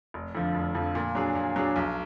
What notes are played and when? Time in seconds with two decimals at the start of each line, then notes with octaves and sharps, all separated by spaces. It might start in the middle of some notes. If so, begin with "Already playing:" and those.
0.14 F1
0.35 F2 D3 F3
0.55 F1
0.75 F2 D3 F3
0.95 A#2
1.15 F#3 D4 G#4
1.35 A#2
1.56 F#3 D4 G#4
1.76 B1